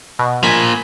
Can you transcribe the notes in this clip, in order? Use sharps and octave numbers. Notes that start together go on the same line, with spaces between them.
B2
F3 A#3 G#5 B5 B6